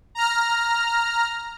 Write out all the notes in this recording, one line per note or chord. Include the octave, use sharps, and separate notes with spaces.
A#5 F6